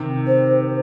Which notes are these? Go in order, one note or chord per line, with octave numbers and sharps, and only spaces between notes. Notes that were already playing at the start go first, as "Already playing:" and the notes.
Already playing: C3 D#3
C5